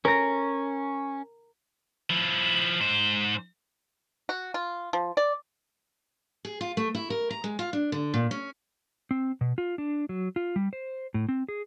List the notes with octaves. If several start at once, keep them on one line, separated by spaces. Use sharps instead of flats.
C#4 A#4 A#6
F3 E4
G#2 C5
F#4
F4
F3
D5
G#4
F4
A3
E4
A#4
A#5
G#3
F4
D4
D3
A#2
C#4
C4
B2
F4
D4
F#3
F4
G3
C5
A2
C4
G#4